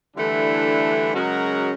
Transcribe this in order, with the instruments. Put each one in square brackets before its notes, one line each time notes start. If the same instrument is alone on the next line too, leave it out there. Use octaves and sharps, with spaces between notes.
[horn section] D3 E3 G3 A3 D4 E4
C#3 F#3 G#3 C#4 F#4 A#4